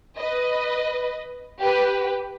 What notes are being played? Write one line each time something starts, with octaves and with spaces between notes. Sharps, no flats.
B4 D#5
G4 B4